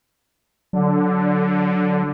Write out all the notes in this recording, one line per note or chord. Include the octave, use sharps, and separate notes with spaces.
D3 F#3